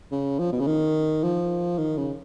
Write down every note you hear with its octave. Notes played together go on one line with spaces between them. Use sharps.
C#3
F3
B2
C#3
D#3
F3
D#3
C#3